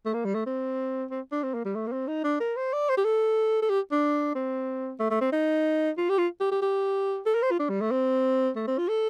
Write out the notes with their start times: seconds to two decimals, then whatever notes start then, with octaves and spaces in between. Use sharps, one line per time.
0.05 A3
0.14 A#3
0.25 G3
0.34 A3
0.46 C4
1.10 C4
1.32 D4
1.43 C4
1.54 A#3
1.65 G3
1.75 A3
1.87 A#3
1.92 C4
2.07 D#4
2.24 D4
2.40 A#4
2.56 C5
2.73 D5
2.89 C5
2.97 G4
3.04 A4
3.62 A4
3.70 G4
3.92 D4
4.35 C4
4.99 A3
5.10 A3
5.21 C4
5.32 D#4
5.97 F4
6.09 G4
6.18 F4
6.40 G4
6.51 G4
6.62 G4
7.26 A4
7.34 A#4
7.42 C5
7.51 F4
7.59 D4
7.69 G3
7.81 A3
7.91 C4
8.56 A3
8.67 C4
8.78 F4
8.88 A4